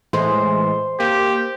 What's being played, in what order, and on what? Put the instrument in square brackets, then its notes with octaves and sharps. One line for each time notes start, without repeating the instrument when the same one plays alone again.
[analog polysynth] A2 E3 G#3 [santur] C5
[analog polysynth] A#3 [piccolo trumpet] G4